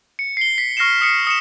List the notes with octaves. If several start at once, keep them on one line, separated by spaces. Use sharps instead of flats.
C#7
C7 G7
B6
C#6 F6 A#6 C7 C#7 E7
D#6 C7 C#7
D#6 C#7 E7